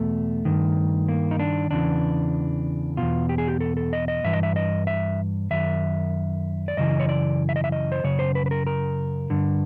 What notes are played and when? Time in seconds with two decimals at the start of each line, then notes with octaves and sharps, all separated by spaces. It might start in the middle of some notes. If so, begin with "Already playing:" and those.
Already playing: E2 B2 A3
0.45 G2 D#3
1.08 A#3
1.31 D#4
1.39 D4
1.71 E2 C#3 E3 D4
2.97 E2 B2 F4
3.29 G4
3.38 G#4
3.48 G4
3.60 A4
3.77 A4
3.93 D#5
4.08 D#5
4.24 G2 E3 E5
4.33 D#5
4.43 E5
4.56 D#5
4.87 E5
5.50 F#2 D#3 E5
6.68 D5
6.77 F#2 C#3 E3 D#5
7.00 C#5
7.09 D5
7.49 E5
7.56 D#5
7.64 E5
7.72 D#5
7.92 C5
8.04 F#2 C#3 C#5
8.19 C5
8.35 B4
8.46 B4
8.51 A#4
8.67 A#4
9.30 G2 D3